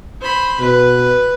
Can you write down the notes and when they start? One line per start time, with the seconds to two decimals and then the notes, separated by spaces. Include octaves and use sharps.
0.20 C5 B5
0.60 B2 B4